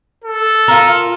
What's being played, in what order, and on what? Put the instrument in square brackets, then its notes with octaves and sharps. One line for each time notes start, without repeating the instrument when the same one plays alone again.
[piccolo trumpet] A4
[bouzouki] F4 A#4